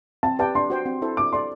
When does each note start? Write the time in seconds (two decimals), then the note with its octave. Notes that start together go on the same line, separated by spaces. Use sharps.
0.23 C4 A5
0.39 G4 B4 D5 G5 A5
0.55 D4 C6
0.70 F#4 C5 G5
0.86 C4
1.02 E4 A4 C5
1.17 D4 D6
1.33 A4 D5 C6